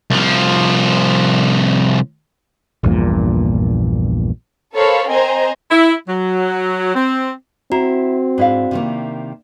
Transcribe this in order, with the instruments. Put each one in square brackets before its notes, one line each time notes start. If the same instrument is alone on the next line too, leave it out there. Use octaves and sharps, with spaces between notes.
[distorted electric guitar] C2 F3
[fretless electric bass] A#1 E2 G2 A#2
[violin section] A4 A#4 C5 C#5 F5 B5
C4 C5 D#5 G#5 A#5
[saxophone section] E4
F#3
C4
[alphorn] C4 [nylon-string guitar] E4 [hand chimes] F#4 [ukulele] A#5
[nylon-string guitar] G#2 [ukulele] D4 E4 F5
[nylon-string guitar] C3 D#3 A#3